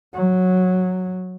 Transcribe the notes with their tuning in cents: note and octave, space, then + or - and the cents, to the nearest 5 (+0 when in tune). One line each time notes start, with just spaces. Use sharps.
F#3 -10